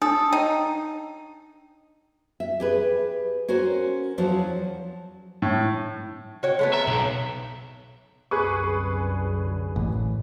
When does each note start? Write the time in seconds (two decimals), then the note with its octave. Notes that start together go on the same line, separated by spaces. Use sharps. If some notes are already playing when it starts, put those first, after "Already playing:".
0.02 D4 A4 G#5 D#6
0.32 D#4 G5
2.40 E5
2.60 G4 G#4 B4
3.48 C#4 F#4 A#4 C5
4.18 E2 F3 F#3 F#4 C5
5.42 A2
6.43 F#4 C#5 G5
6.59 G#3 A3 B3
6.73 E5 A#5
6.87 B1 G5
8.31 C2 F#2 D3 G#4 B4 C#6
9.76 A1